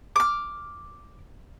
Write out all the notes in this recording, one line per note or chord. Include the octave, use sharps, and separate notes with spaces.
D6 F6